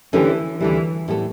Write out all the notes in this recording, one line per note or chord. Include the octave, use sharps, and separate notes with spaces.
D3 E3 A3 C#4 G4
D2 D3 E3 G3
A2 G3 B3 F#4 A4